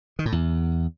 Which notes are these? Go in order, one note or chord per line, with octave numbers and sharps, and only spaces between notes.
D#3
A2
E2